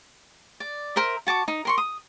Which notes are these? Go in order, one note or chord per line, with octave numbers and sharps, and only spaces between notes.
D5
A#4 C5 E5
F#4 A5 C#6 D6
D#4
A#4 C6 C#6
D#6